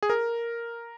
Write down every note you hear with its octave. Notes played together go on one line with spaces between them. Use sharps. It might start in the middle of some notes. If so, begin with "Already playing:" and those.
G#4
A#4